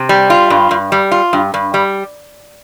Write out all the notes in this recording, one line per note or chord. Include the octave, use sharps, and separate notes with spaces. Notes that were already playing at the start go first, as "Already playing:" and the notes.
Already playing: C3
G3
F4
G2
G2
G3
F4
G2
G2
G3